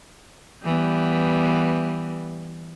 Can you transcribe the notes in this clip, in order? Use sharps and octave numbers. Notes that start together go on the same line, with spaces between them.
E3 G3 B3